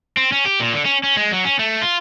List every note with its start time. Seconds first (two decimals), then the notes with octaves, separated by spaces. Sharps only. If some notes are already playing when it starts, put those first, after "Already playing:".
0.17 C4
0.32 C#4
0.45 G4
0.60 A#2
0.73 D3
0.85 C#4
1.03 C#4
1.17 G#3
1.32 F#3
1.45 C#4
1.59 A3
1.81 F4